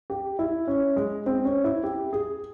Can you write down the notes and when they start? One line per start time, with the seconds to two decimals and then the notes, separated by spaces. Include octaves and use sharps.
0.10 G4
0.39 E4
0.68 C#4
0.96 G#3
1.26 C4
1.45 C#4
1.64 E4
1.83 G4
2.13 G#4